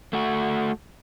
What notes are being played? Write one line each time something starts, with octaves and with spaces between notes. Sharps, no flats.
A3 F#4